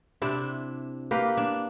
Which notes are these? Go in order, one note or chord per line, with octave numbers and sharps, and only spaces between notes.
C3 D4 E4
A#3 G4 B4
D4